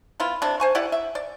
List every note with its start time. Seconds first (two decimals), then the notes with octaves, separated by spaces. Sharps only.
0.20 B3 E4 F4
0.42 C3 D4
0.60 C5 G#5 C#6
0.75 E4 G4 D5 F#5
0.92 E5
1.15 D5